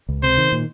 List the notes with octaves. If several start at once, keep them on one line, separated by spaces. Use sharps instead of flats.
C#2
C3 C5
D#3
A#2